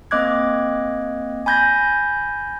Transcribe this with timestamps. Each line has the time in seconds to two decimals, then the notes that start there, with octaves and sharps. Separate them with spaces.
0.11 A#3 C4 D#5 D6 F#6 G#6
1.46 G#5 B5 G6 G#6 A#6